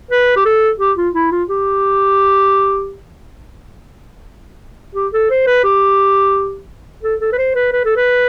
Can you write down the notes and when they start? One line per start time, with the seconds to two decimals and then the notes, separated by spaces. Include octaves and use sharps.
0.11 B4
0.36 G4
0.45 A4
0.80 G4
0.97 F4
1.14 E4
1.31 F4
1.49 G4
4.95 G4
5.13 A4
5.30 C5
5.47 B4
5.64 G4
7.03 A4
7.20 A4
7.33 B4
7.38 C5
7.55 B4
7.72 B4
7.85 A4
7.96 B4